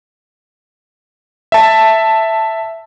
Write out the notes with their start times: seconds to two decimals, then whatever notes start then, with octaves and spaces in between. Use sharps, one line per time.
1.52 E5 A5